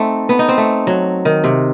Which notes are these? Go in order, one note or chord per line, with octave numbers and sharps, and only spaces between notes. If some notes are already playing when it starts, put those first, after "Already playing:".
Already playing: A3 C4 D#4
B3
D#4
C4
A3
F#3
D#3
C3